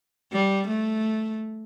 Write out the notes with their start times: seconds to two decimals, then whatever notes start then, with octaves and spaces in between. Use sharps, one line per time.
0.33 G3
0.68 A3